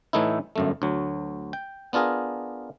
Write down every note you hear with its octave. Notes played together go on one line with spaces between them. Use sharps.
A2 E3 A3 D#4 E4
G1 F#2 A3
D2 F#3
G5
B3 D4 F4 G#4 A#4